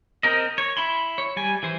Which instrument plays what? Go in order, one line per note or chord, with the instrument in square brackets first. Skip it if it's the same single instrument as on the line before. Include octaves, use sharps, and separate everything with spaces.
[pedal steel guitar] C4 A#4 D#5
C#5
E4 B5 C6
C#5
G3 G#5
E3 C5